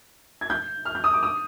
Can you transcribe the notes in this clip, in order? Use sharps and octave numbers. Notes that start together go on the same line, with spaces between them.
G#6
G6
F6
G6
D#6
D6
D#6